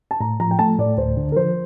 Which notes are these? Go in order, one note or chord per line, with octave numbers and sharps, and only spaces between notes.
A5
A2 A#5
F3 A#5
G5
A3 A5
A2 D5
D2 C5
D3
A#4
F3 C5